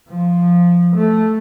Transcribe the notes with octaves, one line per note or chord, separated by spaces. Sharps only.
F3
A3